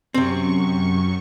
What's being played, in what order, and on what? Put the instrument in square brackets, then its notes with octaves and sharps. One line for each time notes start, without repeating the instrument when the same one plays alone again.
[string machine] F#2 C#6 [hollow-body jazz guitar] C3 C4